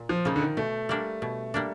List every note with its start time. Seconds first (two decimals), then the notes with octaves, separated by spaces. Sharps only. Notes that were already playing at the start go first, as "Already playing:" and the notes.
Already playing: A#2
0.09 F3
0.25 C#3 F3 A#3 D#4
0.36 D3
0.42 D#3
0.57 B2 A3
0.89 G3 A#3 D4
1.22 B2
1.54 G3 A#3 D4